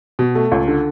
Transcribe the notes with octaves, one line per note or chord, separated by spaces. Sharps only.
B2
A3
C#2
D3